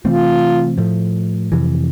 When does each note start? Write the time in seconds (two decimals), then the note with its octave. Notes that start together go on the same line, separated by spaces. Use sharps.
0.04 C3 E3 A3 C4 F4
0.78 A2 F3 A3
1.52 F2 C3 E3